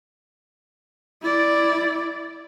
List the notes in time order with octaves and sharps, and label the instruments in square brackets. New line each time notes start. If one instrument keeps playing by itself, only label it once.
[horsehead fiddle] E4 D5